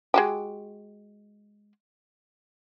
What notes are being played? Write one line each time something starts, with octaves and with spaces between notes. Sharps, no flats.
G#3 F#4 G4